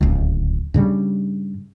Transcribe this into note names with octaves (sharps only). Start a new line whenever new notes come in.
D1 C#2
G2 C#3 G3